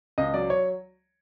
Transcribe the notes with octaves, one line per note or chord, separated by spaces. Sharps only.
C#2 D#5
F#3 D5
C#5